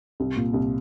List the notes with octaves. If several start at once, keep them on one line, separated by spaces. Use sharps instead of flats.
C2
A#2
C2